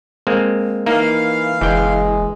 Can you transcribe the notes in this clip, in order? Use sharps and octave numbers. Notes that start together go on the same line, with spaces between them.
G#3 A#3 C4
E3 A#3 D#4 F5
F#1 E3 G#3 G5